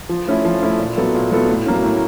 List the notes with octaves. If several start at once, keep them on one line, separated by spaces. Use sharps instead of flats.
F3
A3 C#4 E4
F3
A3 C#4 E4
A#2
F#3 B3 E4 A4
A#2
F#3 B3 E4 A4
A2
F#3 A#3 C#4
A2